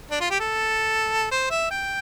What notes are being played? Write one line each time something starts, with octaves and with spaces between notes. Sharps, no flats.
D4
F4
G4
A4
C5
E5
G5